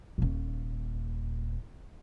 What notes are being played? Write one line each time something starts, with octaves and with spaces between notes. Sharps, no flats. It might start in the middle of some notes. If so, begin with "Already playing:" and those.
D#1 A#2